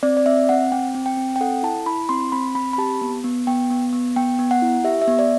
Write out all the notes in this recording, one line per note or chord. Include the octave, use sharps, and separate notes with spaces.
C4 D5
D5
C4 E5
C4 F#5
C4 G5
C4
G5
C4
G5
A4 F#5
E4 A5
E4 B5
C4 C6
C4 B5
C4 B5
B5
G4 A5
B3
B3
B3 G5
B3
B3
B3 G5
B3
F#5
E4
G4 E5
E5
B3
D5